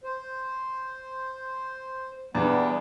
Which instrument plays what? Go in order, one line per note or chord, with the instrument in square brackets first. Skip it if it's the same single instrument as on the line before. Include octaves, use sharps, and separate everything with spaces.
[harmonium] C5
[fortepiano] E2 D4 [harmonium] G3 B3